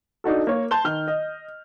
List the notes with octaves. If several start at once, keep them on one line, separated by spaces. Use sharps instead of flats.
D4 D#4 F#4 A4
A#3 C#5
A5 C6 G6 G7
D#3 F6 G7
D#5